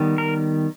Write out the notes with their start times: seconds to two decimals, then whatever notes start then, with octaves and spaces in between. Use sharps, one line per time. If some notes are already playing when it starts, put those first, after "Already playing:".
Already playing: D#3 G3 B3
0.18 A#4